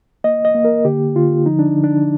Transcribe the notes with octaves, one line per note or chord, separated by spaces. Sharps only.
A#3 D#5
D#5
A#3
A#4
D3 G4
D3 F4
F3 D#4
D4
D3
D4